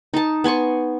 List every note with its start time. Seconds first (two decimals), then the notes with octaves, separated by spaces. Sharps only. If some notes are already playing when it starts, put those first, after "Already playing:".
0.14 D#4 A5
0.44 B3 G#5 C6 C#6